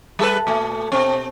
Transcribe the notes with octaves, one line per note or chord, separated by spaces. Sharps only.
G3 A4 B4
A#2 A3
B2 C4